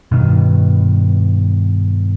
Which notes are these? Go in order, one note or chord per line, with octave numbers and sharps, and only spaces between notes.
G2 B2 D#3